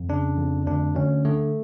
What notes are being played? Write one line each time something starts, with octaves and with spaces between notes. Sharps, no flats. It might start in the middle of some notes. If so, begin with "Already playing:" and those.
Already playing: F2
C#3 D4
F2
D2 D4
D2 C#4
D3 A3